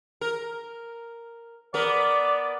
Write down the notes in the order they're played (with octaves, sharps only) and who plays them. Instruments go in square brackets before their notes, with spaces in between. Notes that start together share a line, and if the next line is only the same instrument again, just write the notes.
[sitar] A#4
[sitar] B3 A#4 [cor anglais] D5